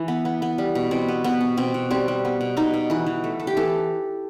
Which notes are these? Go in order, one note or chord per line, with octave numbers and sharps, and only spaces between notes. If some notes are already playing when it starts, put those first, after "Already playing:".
Already playing: E3 E4
B3
B3
B3
G3
B2
B2 C4
B3
B2 B3
B2
B2 C4
B2
G3 C4
G3
B3
B2
B2 D#4
B2
E3 B4
E3
A3
A3
G4
E3 A4